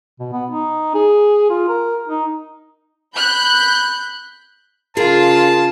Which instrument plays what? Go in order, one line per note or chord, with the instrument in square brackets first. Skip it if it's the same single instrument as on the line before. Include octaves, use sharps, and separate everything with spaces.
[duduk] B2
B3
D#4
G#4
F4
A#4
D#4
[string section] B5 F#6 G6
[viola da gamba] C#3 F4 [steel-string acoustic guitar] G#4 A#4 [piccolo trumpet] A5